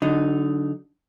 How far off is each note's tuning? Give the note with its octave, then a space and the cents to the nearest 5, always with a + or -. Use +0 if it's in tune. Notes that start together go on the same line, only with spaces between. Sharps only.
D3 -20 F#3 +0 D#4 +0